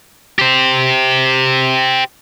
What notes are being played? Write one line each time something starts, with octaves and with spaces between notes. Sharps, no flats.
G4 C5